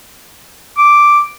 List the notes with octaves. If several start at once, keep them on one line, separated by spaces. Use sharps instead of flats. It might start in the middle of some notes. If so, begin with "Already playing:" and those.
D6